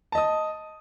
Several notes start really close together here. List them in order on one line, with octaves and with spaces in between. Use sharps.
A5 D#5 D#6